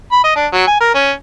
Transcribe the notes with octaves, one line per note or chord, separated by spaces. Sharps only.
B5
D#5
D4
F#3
G#5
A#4
C#4